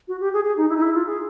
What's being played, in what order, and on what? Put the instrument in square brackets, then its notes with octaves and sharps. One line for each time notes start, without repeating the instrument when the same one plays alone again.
[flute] F#4
G4
G#4
G#4
D#4
E4
D#4
E4
F4
G#4